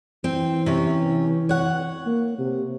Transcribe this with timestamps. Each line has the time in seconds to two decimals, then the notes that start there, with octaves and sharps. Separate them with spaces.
0.24 E3 C4
0.66 C3 C#4 C#5
1.49 C#5 F#5
2.06 A#3
2.39 C3